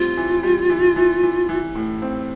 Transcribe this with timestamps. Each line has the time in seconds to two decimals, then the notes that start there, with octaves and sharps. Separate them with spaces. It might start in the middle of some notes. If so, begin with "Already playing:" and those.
Already playing: A2 G3 C4 F4
0.17 E3
0.43 G3
0.70 E3
0.96 E3
1.23 E3
1.49 E3
1.75 A2
2.02 C4